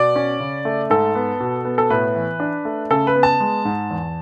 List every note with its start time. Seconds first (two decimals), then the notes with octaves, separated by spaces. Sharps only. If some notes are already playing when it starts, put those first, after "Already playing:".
Already playing: B2 D5
0.16 C#4
0.40 C#3
0.65 A3
0.90 G#2 A4
1.15 B3
1.40 B2
1.65 B3
1.78 A4
1.90 A2 B4
2.15 E3
2.40 D4
2.65 A3
2.90 C#3 A4
3.07 B4
3.15 B3
3.23 A5
3.40 G#3
3.65 G#2
3.90 E2